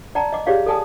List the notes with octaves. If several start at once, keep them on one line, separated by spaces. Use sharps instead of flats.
D5 G5 A5 A#5
D#5 D6
G4 G#4 C#5 D5 F5
A4 D5 G#5 A5 D#6